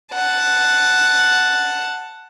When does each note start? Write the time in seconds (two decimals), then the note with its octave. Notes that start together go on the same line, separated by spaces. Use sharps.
0.14 F#5 A5